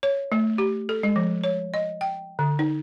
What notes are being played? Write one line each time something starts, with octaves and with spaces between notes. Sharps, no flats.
C#5
A3
G4
A4
G#3
F3
C#5
D#5
G5
D3
D#4